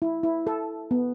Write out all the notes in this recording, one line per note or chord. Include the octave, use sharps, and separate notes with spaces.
E4
E4
A4
B3